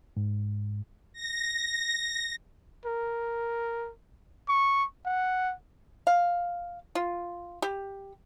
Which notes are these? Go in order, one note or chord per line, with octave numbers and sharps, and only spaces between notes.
G#2
A#6
A#4
C#6
F#5
F5
F4
G4